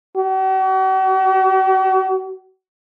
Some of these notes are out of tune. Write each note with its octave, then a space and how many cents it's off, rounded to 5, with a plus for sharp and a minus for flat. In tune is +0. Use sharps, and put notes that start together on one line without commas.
F#4 +45